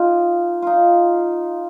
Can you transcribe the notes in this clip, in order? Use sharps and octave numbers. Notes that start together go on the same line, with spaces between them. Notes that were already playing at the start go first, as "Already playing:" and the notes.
Already playing: D#4 F4
D#4 F4